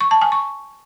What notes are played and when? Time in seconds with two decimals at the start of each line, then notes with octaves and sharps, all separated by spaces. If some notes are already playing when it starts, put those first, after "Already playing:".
0.01 C#6
0.11 A5
0.21 G#5
0.32 C#6